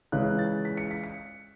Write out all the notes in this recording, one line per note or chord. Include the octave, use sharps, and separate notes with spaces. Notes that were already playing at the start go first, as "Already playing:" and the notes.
C#2 C#3 E3 F#6
A6
B6
C#7
B6
C#7